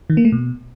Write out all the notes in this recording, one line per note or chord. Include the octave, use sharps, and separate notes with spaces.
D#3
A#3
A3
B2